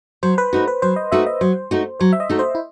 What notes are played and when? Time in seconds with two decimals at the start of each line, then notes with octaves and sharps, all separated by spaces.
0.23 F#3 C5
0.38 B4
0.53 A3 D#4 F#4
0.68 B4
0.82 F#3 C5
0.96 D#5
1.12 A3 D#4 F#4 E5
1.26 D#5
1.41 F#3 C5
1.71 A3 D#4 F#4
2.00 F#3 C5
2.13 E5
2.20 D#5
2.30 A3 D#4 F#4
2.39 C5
2.55 E4